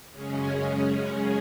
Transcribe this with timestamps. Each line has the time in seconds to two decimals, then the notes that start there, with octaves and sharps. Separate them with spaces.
0.12 F#2 C#3 G#3 C#4 G#4